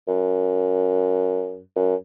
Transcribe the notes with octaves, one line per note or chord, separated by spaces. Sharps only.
F#2
F#2